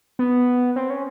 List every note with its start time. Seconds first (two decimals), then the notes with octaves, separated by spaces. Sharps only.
0.19 B3
0.76 C4
0.90 C#4